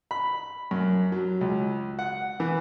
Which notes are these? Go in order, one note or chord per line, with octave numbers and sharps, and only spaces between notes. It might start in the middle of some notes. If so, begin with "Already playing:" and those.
B5
F#2
F#3
C#2
F#5
E3